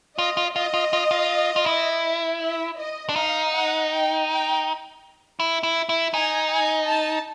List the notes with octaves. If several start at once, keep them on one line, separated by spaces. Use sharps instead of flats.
F4 D#5
F4
F4 D#5
F4
F4
F4
F4
E4
E5
D#5
D4
D#4 F5
F#5
G5
G5
E4
E4
E4
D#4 G#5
G#5
A5